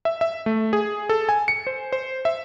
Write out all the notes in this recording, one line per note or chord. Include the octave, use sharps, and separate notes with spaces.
E5
E5
A3
G#4
A4
G#5
C#7
C5
C5
E5